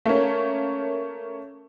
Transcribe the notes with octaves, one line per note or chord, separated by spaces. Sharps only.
A3 A#3 C#4